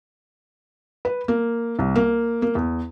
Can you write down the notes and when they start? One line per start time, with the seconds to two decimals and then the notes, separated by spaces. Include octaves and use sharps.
1.05 B4
1.28 A#3
1.79 C2
1.96 A#3
2.42 A#3
2.55 E2